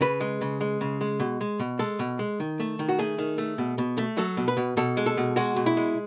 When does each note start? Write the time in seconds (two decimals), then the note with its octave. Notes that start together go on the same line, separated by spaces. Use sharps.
0.01 C#3 B4
0.20 G#3
0.41 C#3
0.61 G#3
0.81 C#3
1.01 G#3
1.20 B2
1.41 G#3
1.59 B2
1.79 G#3 A4
1.99 B2
2.19 G#3
2.40 D#3
2.60 A3
2.79 D#3
2.89 F#4
2.99 A3 G#4
3.18 D#3
3.38 A3
3.58 B2
3.78 B2
3.98 A3
4.17 F#3 A4
4.37 B2
4.48 B4
4.57 B2
4.77 B2 A4
4.97 G#3
5.06 A4
5.17 B2
5.36 G#3 F#4
5.56 B2
5.66 E4
5.77 G#3